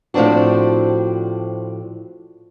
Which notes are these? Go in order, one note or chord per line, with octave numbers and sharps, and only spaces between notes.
A2 F3 C4 D4 F#4